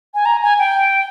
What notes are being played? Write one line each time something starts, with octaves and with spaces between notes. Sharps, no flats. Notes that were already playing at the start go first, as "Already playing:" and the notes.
G#5
A#5
G#5
G5